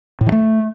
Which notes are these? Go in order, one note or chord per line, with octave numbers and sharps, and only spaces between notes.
A2
E3
A3